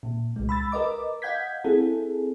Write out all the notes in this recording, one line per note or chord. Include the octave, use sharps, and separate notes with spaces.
A#2
C2 G#3
B5 E6 A6
A#4 B4 D#5 D6
D#5 F5 F#5 G6 G#6 B6
C4 E4 G#4 A4